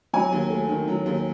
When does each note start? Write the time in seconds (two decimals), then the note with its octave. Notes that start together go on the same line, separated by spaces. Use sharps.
0.13 F#3 G#5
0.32 D#2
0.50 A3
0.69 D#3
0.88 F#3
1.06 D#2